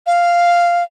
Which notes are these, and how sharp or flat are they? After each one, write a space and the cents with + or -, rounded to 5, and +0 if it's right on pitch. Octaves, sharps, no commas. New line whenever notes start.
F5 -5